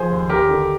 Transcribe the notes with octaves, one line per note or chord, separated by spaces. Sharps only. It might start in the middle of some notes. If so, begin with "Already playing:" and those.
Already playing: F3 G#4 C5
D#2
D#2 G4 A#4
D3